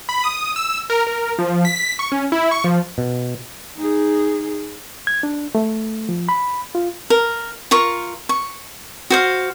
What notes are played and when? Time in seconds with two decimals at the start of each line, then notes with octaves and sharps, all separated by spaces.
0.09 B5
0.24 D#6
0.56 E6
0.90 A#4
1.07 A#4
1.39 F3
1.65 B6
1.99 C#6
2.12 C#4
2.32 E4
2.51 C#6
2.64 F3
2.98 B2
3.77 D#4 G#4
5.07 G#6
5.23 D4
5.55 A3
6.09 F3
6.29 B5
6.75 F4
7.10 A#4
7.71 F4 A#4 C#6
8.29 C#6
9.10 F#4 C5 F5